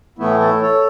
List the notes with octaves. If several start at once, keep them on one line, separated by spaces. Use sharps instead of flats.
A2 E3 A3 B3 E4
E4 A4
A4 C#5